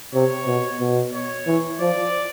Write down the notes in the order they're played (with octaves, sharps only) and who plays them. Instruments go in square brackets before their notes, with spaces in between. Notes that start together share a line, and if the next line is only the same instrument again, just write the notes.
[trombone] C3 [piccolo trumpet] C#5
[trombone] B2
B2
[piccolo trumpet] C#5
[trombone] E3
[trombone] F3 [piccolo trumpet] D5